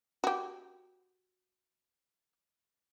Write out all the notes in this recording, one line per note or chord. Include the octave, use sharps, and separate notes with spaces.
F#4 G4